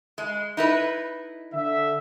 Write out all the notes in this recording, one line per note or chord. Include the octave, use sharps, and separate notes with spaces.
G#3
D#4 E4 B4
D3 E5